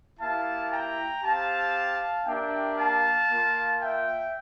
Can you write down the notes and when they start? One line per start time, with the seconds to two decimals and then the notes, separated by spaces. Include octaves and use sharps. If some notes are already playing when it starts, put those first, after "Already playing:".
0.20 A#3 E4 G4 F5 A5
0.72 G5 A#5
1.23 C4 G4 F5 A5
2.25 A#3 D4 G4 E5 G5
2.78 F5 A5
3.29 A#3 F4
3.80 E5 G5